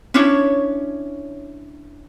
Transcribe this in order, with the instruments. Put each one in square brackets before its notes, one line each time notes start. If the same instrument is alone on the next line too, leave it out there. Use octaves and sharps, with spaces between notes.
[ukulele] C#4 D4 E4 C#5